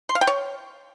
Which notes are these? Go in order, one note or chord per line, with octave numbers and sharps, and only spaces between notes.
C6
F5
G5
C#5